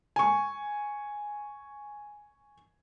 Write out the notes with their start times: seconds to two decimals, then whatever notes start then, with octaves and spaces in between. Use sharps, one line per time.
0.16 G#5 C#6